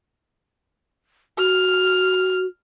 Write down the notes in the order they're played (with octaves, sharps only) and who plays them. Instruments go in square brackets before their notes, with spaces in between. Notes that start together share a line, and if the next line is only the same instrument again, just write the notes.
[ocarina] F#4 [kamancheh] F6